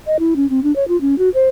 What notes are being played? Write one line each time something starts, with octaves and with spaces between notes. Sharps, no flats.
D#5
E4
C#4
C4
D4
C#5
F4
C#4
F#4
C5